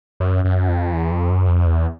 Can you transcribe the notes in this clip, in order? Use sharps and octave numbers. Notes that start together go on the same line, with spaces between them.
F#2
F#2
F2
E2
F2
F#2
F2
E2